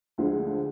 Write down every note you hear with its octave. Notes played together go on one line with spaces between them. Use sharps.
D2 D3 F3 G#3